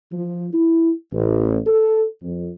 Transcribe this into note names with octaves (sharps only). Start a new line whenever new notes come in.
F3
E4
A1
A4
F2